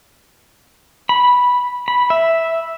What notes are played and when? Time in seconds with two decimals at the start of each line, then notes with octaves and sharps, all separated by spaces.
1.09 B5
1.88 B5
2.10 E5